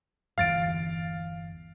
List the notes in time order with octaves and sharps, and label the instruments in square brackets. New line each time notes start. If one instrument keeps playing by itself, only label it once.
[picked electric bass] G1 E2 [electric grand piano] F5 A6 D7